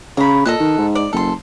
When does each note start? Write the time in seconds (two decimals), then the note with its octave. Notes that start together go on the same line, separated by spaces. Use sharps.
0.17 C#3 A#5 B5
0.45 A#2 A4 D#5 F#6
0.60 D#3
0.78 G#2
0.95 D5
1.13 F#1 A4 C6